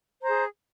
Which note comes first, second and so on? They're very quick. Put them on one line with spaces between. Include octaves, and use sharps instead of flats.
C5 A#5 G#4